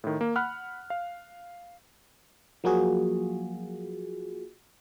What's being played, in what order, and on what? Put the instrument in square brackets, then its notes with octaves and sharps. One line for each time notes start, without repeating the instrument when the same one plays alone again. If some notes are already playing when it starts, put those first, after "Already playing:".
[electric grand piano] A2 D#3
A#3
F#5 B5 F6 F#6
F5
[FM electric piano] F3 F#3 A#3 F4 F#4 G#4